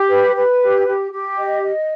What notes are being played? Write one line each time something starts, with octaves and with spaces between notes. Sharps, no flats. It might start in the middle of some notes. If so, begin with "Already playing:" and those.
Already playing: G4
B4
B4
G4
G4
G4
D#5
D#5